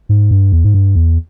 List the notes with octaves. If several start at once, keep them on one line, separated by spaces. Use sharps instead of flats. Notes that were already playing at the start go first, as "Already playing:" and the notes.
G#2
G2
E2
G#2
G2
E2